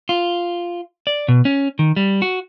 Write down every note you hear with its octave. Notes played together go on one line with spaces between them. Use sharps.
F4
D5
B2
C#4
D#3
G3
F#4